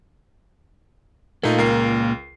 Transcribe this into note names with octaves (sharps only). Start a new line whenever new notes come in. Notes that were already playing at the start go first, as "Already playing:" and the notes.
A#2 A3 A#3 D#4 F4
C#2 A#4 C7